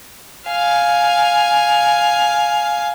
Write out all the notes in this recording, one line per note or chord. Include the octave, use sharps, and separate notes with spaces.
F5 G#5